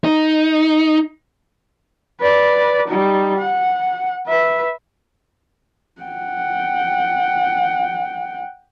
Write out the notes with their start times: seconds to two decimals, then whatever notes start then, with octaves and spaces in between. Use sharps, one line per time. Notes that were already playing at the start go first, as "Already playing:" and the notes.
0.04 D#4
2.20 B4 D5
2.87 G3 D#4
3.38 F#5
4.27 B4 E5
6.02 F#5 G5